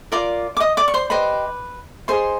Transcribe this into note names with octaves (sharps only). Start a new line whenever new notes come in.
F4 A#4 D5 D6
D6
D#5 D#6
D5 D6
C#6
C5 C6
G4 B4 C5 D#5 B5
D#4 G#4 C5 C6